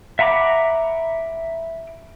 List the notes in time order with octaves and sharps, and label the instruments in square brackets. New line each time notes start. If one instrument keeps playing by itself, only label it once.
[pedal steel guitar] E5 F#5 A#5 B5 D6